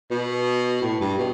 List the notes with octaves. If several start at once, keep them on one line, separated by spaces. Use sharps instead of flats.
B2
A2
G2
B2